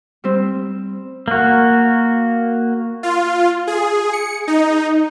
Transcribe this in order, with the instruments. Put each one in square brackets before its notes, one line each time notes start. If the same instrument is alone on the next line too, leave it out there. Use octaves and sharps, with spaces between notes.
[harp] G3 C4
[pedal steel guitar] A#3 F#4
[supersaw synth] F4
G#4
C#7
D#4